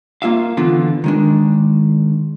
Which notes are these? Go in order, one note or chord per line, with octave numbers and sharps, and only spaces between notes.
A#3 F4 E5 F5
D3 E3 B3 F4
D#3 G#3 D4